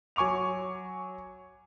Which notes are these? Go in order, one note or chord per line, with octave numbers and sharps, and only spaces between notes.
F#3 G#5 C#6 D6 F7